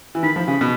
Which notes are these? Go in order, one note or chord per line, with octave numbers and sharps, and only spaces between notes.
E3
D#3 B5
F3
C#3
B2